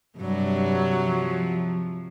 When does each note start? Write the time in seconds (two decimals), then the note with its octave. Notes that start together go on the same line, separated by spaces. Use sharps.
0.18 G2 C3 F#3
1.02 F3